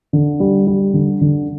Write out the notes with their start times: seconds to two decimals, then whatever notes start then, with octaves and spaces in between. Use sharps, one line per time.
0.13 D3
0.40 G3
0.67 G3
0.94 D3
1.21 D3